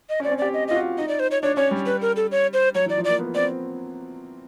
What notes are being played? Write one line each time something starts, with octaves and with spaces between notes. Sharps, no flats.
D#5
C#4
C4 D5
C#4
G4 D5
D#5
F4 D#5
F#4
D#4 D#5
D5
C5
C#5
D4 C#5
C#4 C#5
G3
B4
A#4
A4
C#5
C5
F#3 C#5
E3 D5
F3
A#3 D5
B3
C4 D5